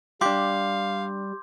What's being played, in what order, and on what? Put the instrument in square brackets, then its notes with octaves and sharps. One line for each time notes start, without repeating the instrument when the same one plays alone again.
[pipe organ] G3 [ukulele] D4 G4 [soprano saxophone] F5 [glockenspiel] C6 D6 G6